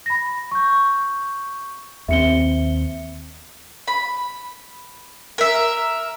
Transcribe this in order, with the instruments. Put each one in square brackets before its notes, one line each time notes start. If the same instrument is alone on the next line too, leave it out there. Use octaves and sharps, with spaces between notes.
[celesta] B5 A#6
C#6 G6
[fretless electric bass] D#2 C4 [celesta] E5 C#7 G7
[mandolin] B5
A#4 E5